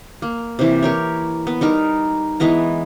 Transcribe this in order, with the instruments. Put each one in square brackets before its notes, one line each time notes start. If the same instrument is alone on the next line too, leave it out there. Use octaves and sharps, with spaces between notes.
[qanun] A#3
C3 E3
G4 A#4 C#5
B3
G3 D#4 A#4
E3 G#3 B3 A#5